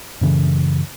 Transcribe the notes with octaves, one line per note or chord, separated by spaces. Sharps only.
F#2 C#3 E3